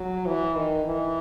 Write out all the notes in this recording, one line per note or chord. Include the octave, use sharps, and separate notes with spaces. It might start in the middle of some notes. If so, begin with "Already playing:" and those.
Already playing: F#3
E3
D#3
E3